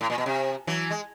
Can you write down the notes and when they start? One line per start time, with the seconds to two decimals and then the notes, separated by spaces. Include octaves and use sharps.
0.01 A2
0.10 A#2
0.18 B2
0.26 C3
0.67 E3 F#3
0.90 G#3